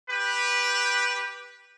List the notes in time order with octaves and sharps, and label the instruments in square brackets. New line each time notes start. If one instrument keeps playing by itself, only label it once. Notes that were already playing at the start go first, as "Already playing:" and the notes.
[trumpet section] G4 B4